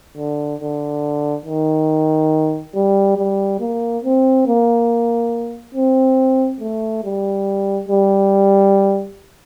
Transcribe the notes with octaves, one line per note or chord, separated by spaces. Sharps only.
D3
D3
D#3
G3
G3
A#3
C4
A#3
C4
A3
G3
G3